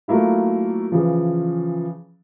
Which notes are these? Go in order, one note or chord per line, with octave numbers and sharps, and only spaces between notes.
F#3 A3 A#3 E4 F4
C#3 E3 F3